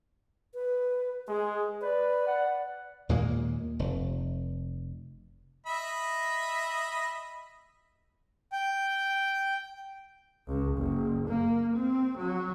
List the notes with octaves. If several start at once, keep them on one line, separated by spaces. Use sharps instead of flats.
B4
G#3 G#4
B4 D5
F#5
D#2 A#2 G#3 A#3
F1
D#5 E5 B5
G5
C#2
F#1
A#3
C4
F#3